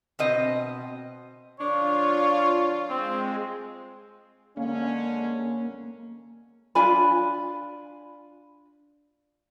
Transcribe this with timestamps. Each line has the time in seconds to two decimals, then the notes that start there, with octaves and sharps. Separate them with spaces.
0.19 B2 C4 D#5
1.59 D3 F3 D4 F4 C#5
2.90 G#3 C4
4.57 D3 G#3 A#3 C#4
6.75 D4 F4 G#5 B5